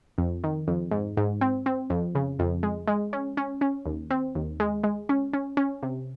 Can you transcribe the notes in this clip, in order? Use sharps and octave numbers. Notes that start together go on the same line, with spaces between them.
F2
D#3
F2
G#2
G#2
C4
C4
F2
C#3
F2
G#3
G#3
C#4
C#4
C#4
D#2
C4
D#2
G#3
G#3
C#4
C#4
C#4
C3